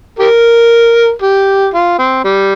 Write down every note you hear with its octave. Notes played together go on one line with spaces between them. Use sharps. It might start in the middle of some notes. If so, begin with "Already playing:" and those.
G4 A#4
G4
F4
C4
G3